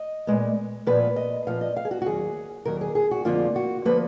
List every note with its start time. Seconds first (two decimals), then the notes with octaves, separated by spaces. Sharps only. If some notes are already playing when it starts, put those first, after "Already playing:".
Already playing: D#5
0.27 A#2 G#3 B3
0.86 A#2 F3 B3 B4
1.16 D#5
1.46 A#2 F3 B3 F5
1.61 D#5
1.76 F5
1.85 G#4
1.91 F#4
2.02 F#4
2.06 D#2 D#3 F#3 G#4
2.65 D#2 D#3 F#3 A#4
2.81 G#4
2.95 G#4
3.11 F#4
3.25 F2 D3 F3 A#3 F4
3.56 F#4
3.85 D3 F3 A#3 B4